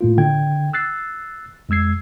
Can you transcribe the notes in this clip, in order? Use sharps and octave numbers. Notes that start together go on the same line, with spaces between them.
A2 A#3 F4
D3 G5 G#6
E6 F#6 A6 C7
F2 G#3 E6 G#6 C7